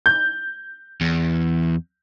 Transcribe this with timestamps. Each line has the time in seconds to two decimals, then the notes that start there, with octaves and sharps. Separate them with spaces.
0.06 G6
1.01 E2